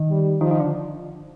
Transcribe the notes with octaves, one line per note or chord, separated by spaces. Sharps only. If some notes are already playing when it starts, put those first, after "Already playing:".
Already playing: D#3
G3
D#3 F3
D#3
D3